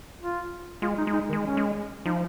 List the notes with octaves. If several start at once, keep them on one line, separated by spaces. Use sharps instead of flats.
F4
G#3 F4
D#4
G#3
D#4
D#3
G#3
C#4
G#3
F3 D#4